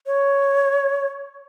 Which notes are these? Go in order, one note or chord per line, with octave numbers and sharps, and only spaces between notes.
C#5